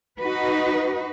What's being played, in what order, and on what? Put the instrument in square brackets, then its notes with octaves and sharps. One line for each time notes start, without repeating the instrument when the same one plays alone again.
[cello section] D#4 F#4 B4